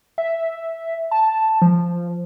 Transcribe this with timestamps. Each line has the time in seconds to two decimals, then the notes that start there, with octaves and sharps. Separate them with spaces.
0.18 E5
1.11 A5
1.62 F3